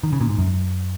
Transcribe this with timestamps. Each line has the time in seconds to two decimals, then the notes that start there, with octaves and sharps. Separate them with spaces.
0.03 D#3
0.13 C#3
0.21 A#2
0.29 G#2
0.38 F#2